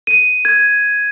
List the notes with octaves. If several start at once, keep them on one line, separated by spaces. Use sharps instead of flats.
D#7
G#6